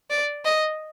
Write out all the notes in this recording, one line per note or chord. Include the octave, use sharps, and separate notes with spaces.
D5
D#5